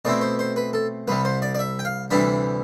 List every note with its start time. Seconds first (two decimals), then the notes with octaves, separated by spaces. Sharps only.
0.05 B2 A3 C4 E4 D5
0.21 C5
0.39 C5
0.56 B4
0.73 A4
1.08 C2 C3 G3 B4
1.25 C5
1.42 D5
1.55 D5
1.59 E5
1.79 G5
1.85 F5
2.11 D2 C3 E3 G3 D4 B5